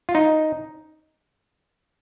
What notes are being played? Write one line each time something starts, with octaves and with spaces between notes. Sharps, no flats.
F4
D#4